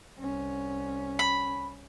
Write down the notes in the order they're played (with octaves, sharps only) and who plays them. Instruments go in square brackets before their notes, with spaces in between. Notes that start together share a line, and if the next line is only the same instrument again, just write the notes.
[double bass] C2 C#4
[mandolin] B5